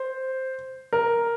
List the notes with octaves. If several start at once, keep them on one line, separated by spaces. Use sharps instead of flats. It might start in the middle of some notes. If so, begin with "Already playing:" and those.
Already playing: C5
A#4